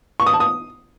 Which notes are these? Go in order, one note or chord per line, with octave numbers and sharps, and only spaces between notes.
C#6
D#6
A5
D#6